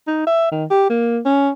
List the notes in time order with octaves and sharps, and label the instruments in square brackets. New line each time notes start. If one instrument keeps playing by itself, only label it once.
[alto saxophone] D#4
E5
D#3
G4
A#3
C#4